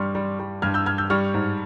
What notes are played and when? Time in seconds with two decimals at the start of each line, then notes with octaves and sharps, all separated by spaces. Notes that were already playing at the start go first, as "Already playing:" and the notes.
Already playing: G2 G3 C6 C#6 F6
0.15 G3
0.40 G3
0.62 G2 F6 G#6
0.74 E6 G6
0.86 G2 F6 G#6
0.98 E6 G6
1.10 G3 C#6 F6
1.34 G#2